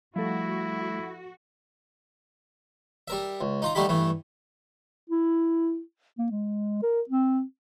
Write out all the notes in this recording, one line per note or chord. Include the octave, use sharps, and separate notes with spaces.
F3 G3 A3 E4 F#4 A4
G3 A#4 E5
C#2
D#4 F4 A#5
D3 G3 A3 D#4 G4 B5
G2 E3 A3
E4
A#3
G#3
A#4
C4